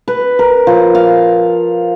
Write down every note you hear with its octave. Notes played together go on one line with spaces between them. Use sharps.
B4
A#4
F3
F5